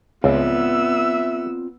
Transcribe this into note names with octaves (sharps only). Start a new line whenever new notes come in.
C#2 B3 C4 F4 D5 E5 E6